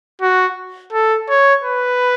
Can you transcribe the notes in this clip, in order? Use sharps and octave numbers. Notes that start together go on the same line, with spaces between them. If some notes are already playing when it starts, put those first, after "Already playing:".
F#4
A4
C#5
B4